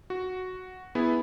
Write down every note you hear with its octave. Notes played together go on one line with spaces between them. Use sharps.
F#4
B3 E4 G#4